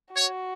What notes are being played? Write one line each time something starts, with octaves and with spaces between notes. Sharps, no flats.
F#4 C#5